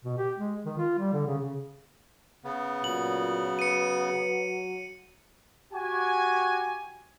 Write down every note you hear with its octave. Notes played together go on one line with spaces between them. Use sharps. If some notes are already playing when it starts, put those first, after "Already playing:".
B2
G4
G#3
D#3
F4
G3
D3
C#3
C#3
C#3 B3
A#2 F#3 F#7
B4 C#7 D#7
F#4 G4 G#5